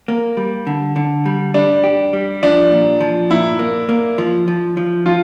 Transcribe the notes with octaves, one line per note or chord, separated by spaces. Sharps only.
A#3
G3
D3
D3
G3
G3 D4
G4
G3
F3 D4
A#2
F3
A#2 E4
A#3
A#3
F3
F3
F3
F3 F4